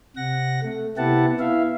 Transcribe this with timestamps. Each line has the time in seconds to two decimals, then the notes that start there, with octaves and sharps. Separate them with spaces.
0.17 C3 F#5 A#6
0.62 A3
0.97 C3 B3 E4 G4 F#5 A5
1.39 B3 E4 E5 F5